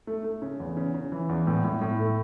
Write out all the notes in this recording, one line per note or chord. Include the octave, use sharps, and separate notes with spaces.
A3
A3
C#3
E2
C#3
C#3
E3
E2
A2
A2
A2
A3